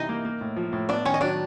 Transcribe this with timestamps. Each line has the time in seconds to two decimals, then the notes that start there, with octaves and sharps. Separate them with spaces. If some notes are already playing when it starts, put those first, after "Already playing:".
Already playing: C3 E3 G3 D#4 D#5
0.09 A#3
0.25 A#3
0.41 A2
0.56 F3
0.73 A2
0.89 B3 D4 D5
1.05 D#3 C#4 C#5
1.14 D#5
1.21 F#3 D4 D5